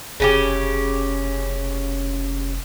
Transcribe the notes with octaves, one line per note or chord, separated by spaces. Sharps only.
F1 C#3 C#4 G4